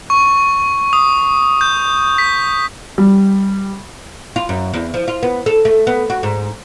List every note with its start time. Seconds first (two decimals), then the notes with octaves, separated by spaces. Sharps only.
0.10 C#6
0.93 D#6
1.61 G6
2.18 B6
2.98 G3
4.36 F4
4.49 F#2
4.73 E2
4.94 F3
5.08 F4
5.23 B3
5.46 A4
5.65 A3
5.87 B3
6.10 F#4
6.23 G#2